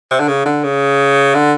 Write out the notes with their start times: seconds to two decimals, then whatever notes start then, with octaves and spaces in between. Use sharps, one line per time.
0.11 C3
0.20 D3
0.28 C#3
0.46 D3
0.64 C#3
1.35 D3